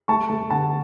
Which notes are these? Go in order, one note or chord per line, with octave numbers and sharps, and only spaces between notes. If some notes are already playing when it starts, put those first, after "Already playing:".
A3 A5 C#6
A3
D3 F#5 A5